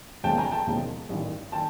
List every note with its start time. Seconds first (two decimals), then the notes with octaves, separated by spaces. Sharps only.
0.23 E1 D#2 C#3 F3 G#3 G5 A5
0.38 G#5 A#5
0.52 G5 A5
0.67 E1 D#2 C#3 F3 G#3
1.09 A1 G2 D#3
1.52 D#3 G5 A5